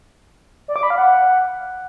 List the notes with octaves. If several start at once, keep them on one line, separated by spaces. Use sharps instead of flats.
D5
D6
B5
F5
F#5